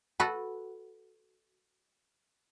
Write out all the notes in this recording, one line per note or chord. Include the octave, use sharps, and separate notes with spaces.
F#4 A4 B4